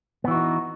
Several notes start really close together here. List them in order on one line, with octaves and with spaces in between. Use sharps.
B3 E3 F#4 D#4